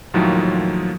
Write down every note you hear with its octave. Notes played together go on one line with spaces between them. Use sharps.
D#2 A2 D#3 F3 F#3 A#3